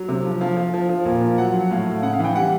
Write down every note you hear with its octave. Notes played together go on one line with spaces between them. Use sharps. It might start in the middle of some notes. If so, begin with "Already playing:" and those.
Already playing: F#3
C3
F3
F3 F5
F3
F3
F3
A#2
F3
F#3 F#5
F#3
A2 F5
A2
C#3 F#5
F5
E3
G5
G3 F#5